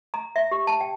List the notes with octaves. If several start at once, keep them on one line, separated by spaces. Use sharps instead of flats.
A#5
E5
G4
A5
G5